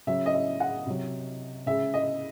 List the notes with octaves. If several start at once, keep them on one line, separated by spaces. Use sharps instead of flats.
C#3 F#3 E5
D#5
E5
F#5
C3 F#3
C#3 G#3 E5
D#5